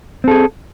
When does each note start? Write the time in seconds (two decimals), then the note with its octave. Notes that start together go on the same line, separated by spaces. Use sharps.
0.24 C4
0.28 A4
0.31 G#4